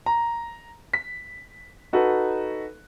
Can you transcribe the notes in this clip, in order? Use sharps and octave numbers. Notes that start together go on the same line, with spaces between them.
A#5
B6
D#4 F#4 A4 B4